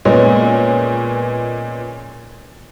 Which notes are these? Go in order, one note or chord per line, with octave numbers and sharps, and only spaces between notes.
A#2 G#3 B3 C#4